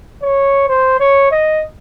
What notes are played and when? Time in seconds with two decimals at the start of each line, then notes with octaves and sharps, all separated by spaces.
0.23 C#5
0.69 C5
1.00 C#5
1.32 D#5